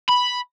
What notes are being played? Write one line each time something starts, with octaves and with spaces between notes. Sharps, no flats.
B5